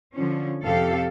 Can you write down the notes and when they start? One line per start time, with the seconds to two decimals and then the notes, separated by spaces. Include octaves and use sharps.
0.14 D3 F3 C#4
0.64 F2 C3 F3 G4 A4 F5